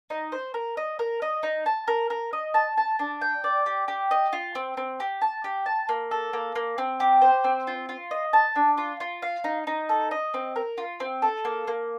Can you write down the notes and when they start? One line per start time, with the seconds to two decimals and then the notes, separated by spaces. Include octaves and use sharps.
0.10 D#4
0.32 C5
0.54 A#4
0.77 D#5
0.99 A#4
1.22 D#5
1.43 D#4
1.66 A5
1.88 A#4
2.10 A#4
2.33 D#5
2.54 A5
2.77 A5
2.99 D4
3.21 G5
3.44 D5
3.66 G4
3.88 G4
4.11 D#5
4.33 F4
4.55 C4
4.77 C4
5.00 G4
5.22 A5
5.44 G4
5.66 A5
5.89 A#3
6.11 A4
6.33 A#3
6.55 A#3
6.78 C4
7.00 G4
7.22 C5
7.44 C4
7.67 F4
7.89 F4
8.11 D#5
8.33 A5
8.56 D4
8.78 F4
9.00 F4
9.22 F5
9.44 D#4
9.67 D#4
9.89 A4
10.11 D#5
10.34 C4
10.56 A#4
10.78 F4
11.00 C4
11.22 A4
11.45 A#3
11.67 A#3